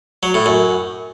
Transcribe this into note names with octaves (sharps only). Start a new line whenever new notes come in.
F#3
A2
F#2